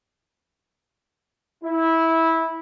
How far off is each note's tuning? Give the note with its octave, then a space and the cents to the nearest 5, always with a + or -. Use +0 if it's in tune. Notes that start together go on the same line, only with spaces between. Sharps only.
E4 -15